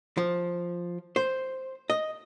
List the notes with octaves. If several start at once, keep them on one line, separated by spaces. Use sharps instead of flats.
F3
C5
D#5